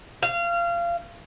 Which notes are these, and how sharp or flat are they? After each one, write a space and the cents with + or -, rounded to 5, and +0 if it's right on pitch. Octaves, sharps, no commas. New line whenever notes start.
F5 -25